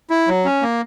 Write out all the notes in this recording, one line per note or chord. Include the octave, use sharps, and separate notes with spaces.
E4
F#3
C#4
A#3